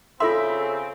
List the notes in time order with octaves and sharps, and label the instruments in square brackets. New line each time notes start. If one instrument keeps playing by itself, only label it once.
[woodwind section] C#3 C4 [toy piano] F4 A4 C6 [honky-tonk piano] E5